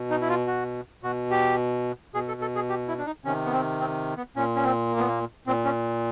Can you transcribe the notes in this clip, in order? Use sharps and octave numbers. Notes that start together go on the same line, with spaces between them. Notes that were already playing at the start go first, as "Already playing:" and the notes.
Already playing: B2
D#4
E4
F4
F#4
B2 F#4
G4
B2 G#4
A4
A4
G#4
G4
E4
D4
D#4
C3 D#3 C#4
B3
C4
C4
B3
A#2 C#4
C#4
C4
A#3
B3
A#3
A#2 C4
C#4